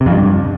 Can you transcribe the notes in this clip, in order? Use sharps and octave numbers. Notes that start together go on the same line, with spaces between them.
C3
F2
G2